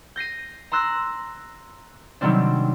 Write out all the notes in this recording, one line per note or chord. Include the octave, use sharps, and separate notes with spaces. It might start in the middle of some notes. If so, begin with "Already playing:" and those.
G6 A#6 C7 D#7
A#5 C6 E6 F#6 A#6
C3 D#3 F#3 G3 C4 D4